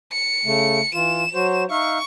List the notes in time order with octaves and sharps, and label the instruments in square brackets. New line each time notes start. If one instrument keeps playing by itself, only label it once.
[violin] C#7
[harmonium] C#3 A3
[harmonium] E3 F4 [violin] E7
[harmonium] F#3 F#4 C5
[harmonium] D#4 E5 F5 [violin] C#6